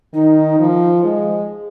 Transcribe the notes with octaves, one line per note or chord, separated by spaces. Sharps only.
D#3 D#4
F3
G#3